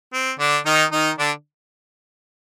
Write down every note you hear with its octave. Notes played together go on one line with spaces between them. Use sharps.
C4
D3 D4
D#3 D#4
D#3 D#4
D3 D4